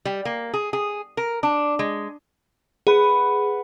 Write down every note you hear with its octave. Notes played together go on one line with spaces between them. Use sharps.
G3
A#3
G#4
G#4
A#4
D4
G#3
G#4 B4 F#5